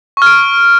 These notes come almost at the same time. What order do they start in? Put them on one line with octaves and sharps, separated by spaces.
C#6 F6 D7